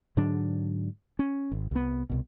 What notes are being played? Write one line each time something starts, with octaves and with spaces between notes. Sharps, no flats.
G#2 D3 F#3 D4
C#4
G#1
C2 B3
C2 B2